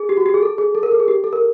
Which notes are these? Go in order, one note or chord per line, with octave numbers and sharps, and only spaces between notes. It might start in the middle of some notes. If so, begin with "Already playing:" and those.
Already playing: G#4
G4
F#4
G4
G#4
A4
G#4
A4
A#4
A4
G#4
G4
A4
A#4